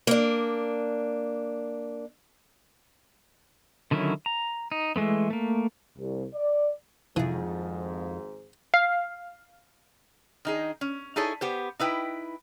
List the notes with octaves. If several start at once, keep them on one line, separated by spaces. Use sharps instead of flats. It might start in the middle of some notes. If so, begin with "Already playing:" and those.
A#3 D4
D3 D#3 F#3 C#4 E4
A#5
D#4
E3 G#3 A3 B3
A3 A#3
C2
D5
G#1 F2 G#2 E3 F3 G#4
F5
D#3 D#4 G#4
C#4
D#4 E4 G#4 A4 C#5
B3 G4 C5
D#4 E4 B4 G5